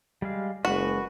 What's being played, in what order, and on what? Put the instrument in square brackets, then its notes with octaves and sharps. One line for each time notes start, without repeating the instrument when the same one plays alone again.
[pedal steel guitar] G3 G#3 F5
[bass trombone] F#1 [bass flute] G#3 [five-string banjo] F#4 [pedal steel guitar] B4